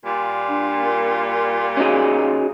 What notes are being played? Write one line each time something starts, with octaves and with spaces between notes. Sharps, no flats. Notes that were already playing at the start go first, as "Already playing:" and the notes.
A#2 G3 F4
D4
A#4
C#4 D#4 F#4 G#4